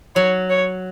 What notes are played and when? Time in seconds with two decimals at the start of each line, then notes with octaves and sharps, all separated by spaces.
0.16 F#3 C#5
0.50 C#5